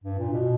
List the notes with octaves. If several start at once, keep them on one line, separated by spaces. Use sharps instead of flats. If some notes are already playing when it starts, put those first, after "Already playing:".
G2
A#2
B2